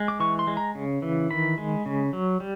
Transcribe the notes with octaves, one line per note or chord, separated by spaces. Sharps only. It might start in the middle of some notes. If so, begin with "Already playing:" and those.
Already playing: G#3
D6
E3 C#6
C6
G#3
A#5
C#3
E3
D#3 B5
G#3
C#3
F#3
G3